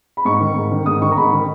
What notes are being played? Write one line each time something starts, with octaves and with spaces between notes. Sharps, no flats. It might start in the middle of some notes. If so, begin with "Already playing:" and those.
B5
G#2 C#6
D#3
G#2
D#3
G#2 D#6
D#3 C#6
A#5
G#2 B5
D#3